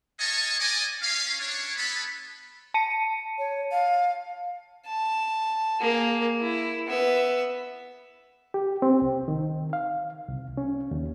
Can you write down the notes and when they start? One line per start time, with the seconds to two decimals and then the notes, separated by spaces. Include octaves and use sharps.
0.19 C#5 D#5 F5 G#5 A5 C#6
0.60 D5 D#5 G#5
1.02 C#4 F5
1.40 D4 C#5
1.76 B3 A4 B5
2.74 A5 C#7 D#7
3.38 C#5
3.71 F5
4.86 A5
5.81 A#3 G#4
6.40 E4
6.87 B3 E5
8.54 G4
8.82 C4
9.02 C2
9.28 D#3
9.73 F5
10.28 C2
10.57 C#4
10.91 D#2